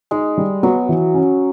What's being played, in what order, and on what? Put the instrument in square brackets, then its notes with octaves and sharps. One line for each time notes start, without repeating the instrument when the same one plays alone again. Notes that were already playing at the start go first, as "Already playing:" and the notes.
[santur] G#3 [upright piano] D#4
[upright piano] G3
[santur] F#3 [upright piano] B3
[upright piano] E3
C#4